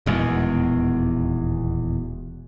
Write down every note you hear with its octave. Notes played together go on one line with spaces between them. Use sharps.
D#1 E2 B2 G#3